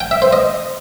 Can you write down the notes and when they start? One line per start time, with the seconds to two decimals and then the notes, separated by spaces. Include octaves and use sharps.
0.01 G5
0.11 E5
0.22 C5
0.33 D#5